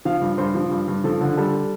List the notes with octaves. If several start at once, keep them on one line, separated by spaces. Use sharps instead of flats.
F3 F5
G2
G2 C5
F3
G2
G2
F3 A4
D3
G3 A4